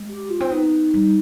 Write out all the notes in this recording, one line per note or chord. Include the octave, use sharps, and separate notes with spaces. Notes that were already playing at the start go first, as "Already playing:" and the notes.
Already playing: G#3
G4
F4
C4
B3 D#4
G3